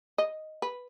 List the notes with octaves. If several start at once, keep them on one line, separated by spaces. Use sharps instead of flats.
D#5
B4